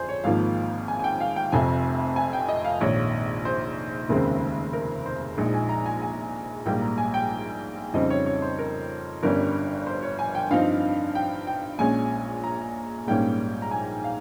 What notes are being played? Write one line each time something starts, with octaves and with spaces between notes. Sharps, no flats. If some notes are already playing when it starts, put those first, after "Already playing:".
Already playing: G1 F2 G#4 C5
C#5
G#1 G#2 F3 A#3 F5
G#5
G#5
G5
F5
G5
F1 F2 C3 G#5
G#5
G5
D#5
F5
A#1 G#2 D#3 C#5
C5
F1 D#2 C#3 G#3 C4 A#4
A#4
C5
A#1 A#2 F3 G#3 D#4
G#5
A#5
G#5
G#5
A#1 G#2 G3 A#3 G5
A#5
G#5
G5
F2 C#3 G3 C4 D#4 D#5
C#5
C#5
C5
A#4
G1 G2 G3 C#4 A#4
C5
C#5
G#5
G5
G2 F3 C4 D#4 F5
G5
G5
A#1 A#2 G#3 C#4 G#5
A#5
A#1 G#2 G3 A#3 C#4 G5
A#5
G#5
F5